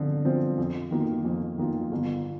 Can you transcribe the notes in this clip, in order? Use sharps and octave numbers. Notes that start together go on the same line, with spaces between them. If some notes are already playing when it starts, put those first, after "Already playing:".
Already playing: D3 F3 C4 F4
F3 C4 F4
F2
D#3 A#3 F4
F2
D#3 A#3 F4
G1